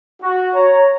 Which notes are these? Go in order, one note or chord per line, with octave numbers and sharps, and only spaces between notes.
F#4
C#5 A#5